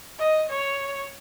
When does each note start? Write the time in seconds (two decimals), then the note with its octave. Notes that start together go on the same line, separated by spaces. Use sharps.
0.19 D#5
0.50 C#5